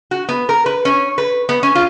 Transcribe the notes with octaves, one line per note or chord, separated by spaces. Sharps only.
F#4
B3
A#4
B4
C#4
B4
B3
C#4
F4